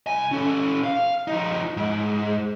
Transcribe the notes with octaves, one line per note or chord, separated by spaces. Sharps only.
C2 G#5
C#4 A4
F5
F3 D#4
G#2